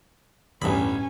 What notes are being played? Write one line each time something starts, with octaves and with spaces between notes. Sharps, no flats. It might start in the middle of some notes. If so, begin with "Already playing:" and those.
A1 E2 G2 C#4 G#5 B5